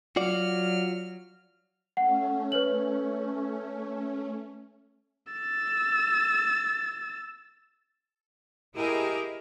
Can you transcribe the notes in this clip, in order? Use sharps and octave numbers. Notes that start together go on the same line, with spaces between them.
F#3 F4 F#4 D5 F6
A3 C#4 F#5
B4 C#5 F#7
E6 A6
E4 G4 G#4 A#4 D#5